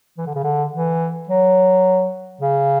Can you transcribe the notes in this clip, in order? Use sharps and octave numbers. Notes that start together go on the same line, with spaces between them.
E3
D3
C#3
D3
E3
F#3
C#3